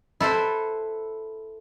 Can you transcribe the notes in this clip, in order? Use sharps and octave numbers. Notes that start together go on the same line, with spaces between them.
E4 A4 B4 C5